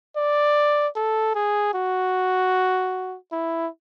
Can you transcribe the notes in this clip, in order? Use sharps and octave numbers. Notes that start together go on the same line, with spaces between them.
D5
A4
G#4
F#4
E4